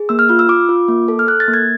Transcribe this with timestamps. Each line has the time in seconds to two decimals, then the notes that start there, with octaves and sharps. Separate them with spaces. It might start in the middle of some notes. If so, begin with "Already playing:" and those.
Already playing: G#4
0.09 A#3 E6
0.19 F6
0.29 F4 F6
0.39 E6
0.49 F4 D6
0.69 F4
0.88 A#3
1.08 A4
1.19 F6
1.27 A4 F#6
1.40 A6
1.48 A#3
1.54 G#6